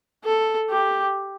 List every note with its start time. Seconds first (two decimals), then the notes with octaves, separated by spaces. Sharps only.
0.25 A4
0.71 G4